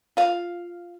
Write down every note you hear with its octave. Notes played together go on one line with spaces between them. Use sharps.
F4 F5